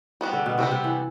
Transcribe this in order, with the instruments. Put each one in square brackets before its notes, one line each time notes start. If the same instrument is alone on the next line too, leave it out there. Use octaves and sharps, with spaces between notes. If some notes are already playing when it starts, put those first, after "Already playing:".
[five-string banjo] G3 B3 F#4
[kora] D3
B2
[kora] C3 [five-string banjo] G3 B3 F#4
[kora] C3
E3